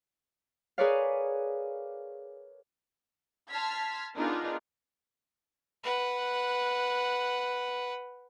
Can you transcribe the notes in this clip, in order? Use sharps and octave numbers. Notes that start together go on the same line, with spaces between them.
G#4 A#4 B4 C#5 D5 F5
A5 C6 F6 G#6 B6
B3 D4 D#4 F4 G#4 A#4
B4 F#5